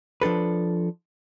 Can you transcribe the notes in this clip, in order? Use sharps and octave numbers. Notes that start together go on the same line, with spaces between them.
F3 D4 A4 B4